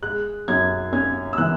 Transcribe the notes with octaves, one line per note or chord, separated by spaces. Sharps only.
G#3 F#6
F#2 G#6
C#4 G#6
E6
E3 F#6